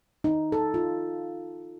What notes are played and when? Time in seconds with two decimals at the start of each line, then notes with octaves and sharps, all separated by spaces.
0.24 D#4
0.52 A4
0.74 F4